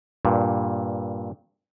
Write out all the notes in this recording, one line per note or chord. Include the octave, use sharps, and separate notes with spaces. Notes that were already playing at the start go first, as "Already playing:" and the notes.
G2 A#2